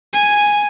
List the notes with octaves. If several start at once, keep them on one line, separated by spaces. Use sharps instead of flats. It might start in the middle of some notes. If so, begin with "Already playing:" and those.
G#5